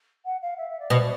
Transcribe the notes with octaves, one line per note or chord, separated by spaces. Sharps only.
F#5
F5
E5
E5
D5
B2